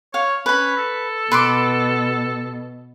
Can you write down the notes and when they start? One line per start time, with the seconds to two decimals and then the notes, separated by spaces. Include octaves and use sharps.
0.14 C#5 F5
0.46 C#4 B4 B5
0.77 A4
1.32 B2 B4 C6 D6